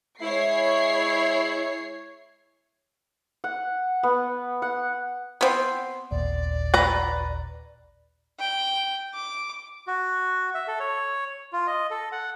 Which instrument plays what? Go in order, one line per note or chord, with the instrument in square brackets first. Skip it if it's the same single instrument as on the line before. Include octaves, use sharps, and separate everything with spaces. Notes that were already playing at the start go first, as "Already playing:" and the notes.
[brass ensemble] G#3 G#4 E5 [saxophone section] E4 [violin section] C#5 C7
[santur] F#5
B3
F#5
[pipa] B3 C4 [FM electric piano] C6
[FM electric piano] A1 D#2 A#2 [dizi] D5
[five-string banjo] B4 A#5
[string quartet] G5
D6
[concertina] F#4
E5
A4
C#5
F4
D#5
A4
F#5